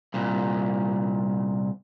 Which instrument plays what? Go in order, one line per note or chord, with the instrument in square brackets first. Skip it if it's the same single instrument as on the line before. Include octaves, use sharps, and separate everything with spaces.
[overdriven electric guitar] C2 A#2